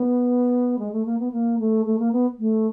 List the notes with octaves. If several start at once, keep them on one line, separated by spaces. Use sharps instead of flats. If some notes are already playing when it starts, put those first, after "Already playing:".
Already playing: B3
G#3
A3
A#3
B3
A#3
A3
A3
A#3
B3
A3